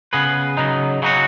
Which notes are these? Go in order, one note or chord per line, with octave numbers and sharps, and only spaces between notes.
C#3 B3 G#4 B4
C#3 F#3 D#4
C#3 F#3 D#4 F#4